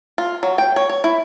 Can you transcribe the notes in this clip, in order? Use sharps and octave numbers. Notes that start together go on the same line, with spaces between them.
F4
F#3
G5
C#5
C#5
E4